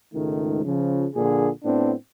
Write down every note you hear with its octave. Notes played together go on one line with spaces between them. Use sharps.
C#2 G#2 D#3 A3
C#3 F3
A#1 A#2 D3 G#4
A2 B3 C4 D4